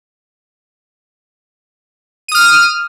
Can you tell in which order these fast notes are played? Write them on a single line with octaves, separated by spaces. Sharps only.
D#7 D#6 F6